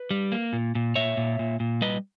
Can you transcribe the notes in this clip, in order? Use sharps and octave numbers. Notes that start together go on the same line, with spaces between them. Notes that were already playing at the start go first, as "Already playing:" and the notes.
Already playing: B4
G3
A#3
A#2
A#2
A#2 C#5 E5
A#2
A#2
A#2
G3 B4 D#5